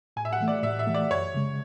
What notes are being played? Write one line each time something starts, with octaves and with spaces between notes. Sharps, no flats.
A2 G#5
E5
F#5
E3 A3
D5
A2 E5
E5
E3 A3
D5
F#2 C#5
C#3 G#3